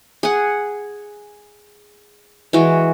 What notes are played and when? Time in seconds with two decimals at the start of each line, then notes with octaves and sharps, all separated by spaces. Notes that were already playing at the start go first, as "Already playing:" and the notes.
0.23 G#4 F#5
2.53 E3 G#3 F#4